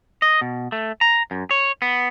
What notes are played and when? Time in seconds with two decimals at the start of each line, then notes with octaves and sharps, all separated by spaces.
0.22 D#5
0.41 B2
0.72 A3
1.01 A#5
1.31 F#2
1.51 C#5
1.82 B3